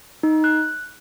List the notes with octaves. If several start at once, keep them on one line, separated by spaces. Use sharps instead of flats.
D#4
F#6